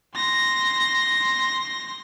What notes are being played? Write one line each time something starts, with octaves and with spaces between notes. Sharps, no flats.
C6 A#6